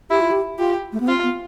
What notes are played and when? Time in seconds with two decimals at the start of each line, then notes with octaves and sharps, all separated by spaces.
0.10 E4 G4
0.21 F4
0.31 G4
0.58 F4 G4
0.93 A3
1.00 B3
1.07 C4 F4
1.23 B3